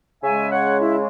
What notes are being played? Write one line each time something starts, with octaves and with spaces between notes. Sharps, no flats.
C#3 G#3 E5 G#5
C#5 F#5
E4